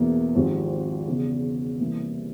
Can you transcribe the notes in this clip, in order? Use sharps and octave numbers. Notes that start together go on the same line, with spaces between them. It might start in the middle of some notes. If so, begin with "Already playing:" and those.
Already playing: E1 E2 E3 A#3
G#1 G#2 F3 C4 G4
E1 E2 C#3
C2 C3 E3 A#3